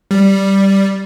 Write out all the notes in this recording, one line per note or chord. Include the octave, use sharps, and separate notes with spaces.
G3